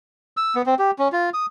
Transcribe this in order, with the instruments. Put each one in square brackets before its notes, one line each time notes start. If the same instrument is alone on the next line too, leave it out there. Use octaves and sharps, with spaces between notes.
[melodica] E6
B3
C4
G4
C#4
F4
D#6